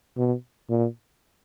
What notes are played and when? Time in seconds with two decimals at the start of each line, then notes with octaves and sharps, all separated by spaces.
0.17 B2
0.70 A#2